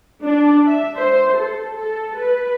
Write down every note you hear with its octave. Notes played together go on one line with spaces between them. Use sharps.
D4
E5
C5
A4
A4
B4